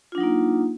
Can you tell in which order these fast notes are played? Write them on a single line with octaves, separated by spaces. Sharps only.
F4 D4 F#3 D#4 A#3